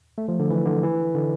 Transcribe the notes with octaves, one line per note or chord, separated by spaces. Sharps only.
A3
F3
D3
E3
D3
E3
D3